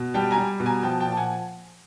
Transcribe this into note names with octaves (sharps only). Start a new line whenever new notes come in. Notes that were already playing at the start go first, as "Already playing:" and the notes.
Already playing: B2
G3 G5 A5
G#5 A#5
G3
B2
G#5 A#5
F3 G5 A5
G5 A5
A#2
A5
F#5 G#5